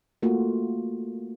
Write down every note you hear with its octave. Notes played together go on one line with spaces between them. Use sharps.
A3 A#3 F4 F#4